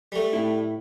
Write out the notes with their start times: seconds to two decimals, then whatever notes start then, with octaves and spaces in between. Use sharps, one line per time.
0.12 G3 A3
0.33 A2 E4